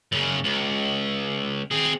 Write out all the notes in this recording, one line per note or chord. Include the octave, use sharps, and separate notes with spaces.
F#2 C#3
C#2
C4 G#4